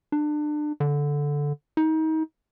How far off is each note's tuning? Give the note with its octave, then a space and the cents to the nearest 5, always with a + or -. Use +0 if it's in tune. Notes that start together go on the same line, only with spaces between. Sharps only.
D4 +30
D3 -10
D#4 +30